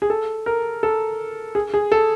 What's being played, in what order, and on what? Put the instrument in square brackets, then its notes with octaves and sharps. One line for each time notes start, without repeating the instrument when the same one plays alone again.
[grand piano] G#4
A4
A#4
A4
G#4
G#4
A4